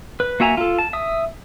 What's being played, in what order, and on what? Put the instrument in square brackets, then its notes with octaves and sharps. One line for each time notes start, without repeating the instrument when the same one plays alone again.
[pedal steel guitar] B4
A#3 F#4 E5 G#5 A#5
F4 A4
A5
E5 D#6